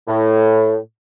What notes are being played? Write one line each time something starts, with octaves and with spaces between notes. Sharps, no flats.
A2